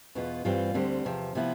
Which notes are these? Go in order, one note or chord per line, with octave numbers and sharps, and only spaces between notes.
E2 B2 B3 F4
G2 E3 G3 C4 F4
D2 D3 G3 C4
E2 C3 F3
C3 F3 B3 E4